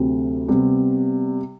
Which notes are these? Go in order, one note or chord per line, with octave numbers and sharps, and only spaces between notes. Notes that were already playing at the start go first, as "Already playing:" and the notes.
Already playing: D2 C3 F#3 C4
C3 G3 B3